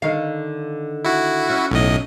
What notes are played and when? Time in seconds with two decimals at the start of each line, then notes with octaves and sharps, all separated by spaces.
0.02 D3 D#3 F5
1.04 E4 F#4
1.50 C#4
1.71 B1 A2 D#5